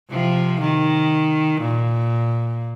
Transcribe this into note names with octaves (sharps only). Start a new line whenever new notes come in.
C3 F3
D#3
A#2